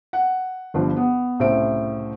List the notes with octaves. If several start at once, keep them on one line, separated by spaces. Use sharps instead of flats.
F#5
G1 G2 F3 B4
B3
C2 A2 C#3 C5 E5 D7